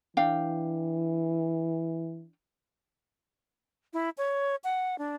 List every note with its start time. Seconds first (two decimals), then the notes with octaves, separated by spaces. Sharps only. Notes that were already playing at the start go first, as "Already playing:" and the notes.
0.17 E3 D4 F5 G5
3.93 E4
4.18 C#5
4.64 F#5
4.98 D4